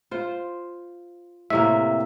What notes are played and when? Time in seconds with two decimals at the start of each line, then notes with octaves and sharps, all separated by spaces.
0.11 F4 C5
1.50 A2 C3 A#3 E5